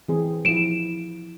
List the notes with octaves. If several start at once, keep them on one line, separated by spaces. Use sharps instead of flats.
E3 C4 G#4
F3 E4 D7 E7